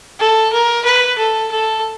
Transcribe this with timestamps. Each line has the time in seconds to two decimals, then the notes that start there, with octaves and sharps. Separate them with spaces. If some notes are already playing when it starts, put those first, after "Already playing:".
0.19 A4
0.53 A#4
0.85 B4
1.18 A4
1.51 A4